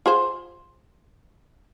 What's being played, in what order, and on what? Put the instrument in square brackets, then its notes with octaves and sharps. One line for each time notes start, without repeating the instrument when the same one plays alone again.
[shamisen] F4 G#4 C5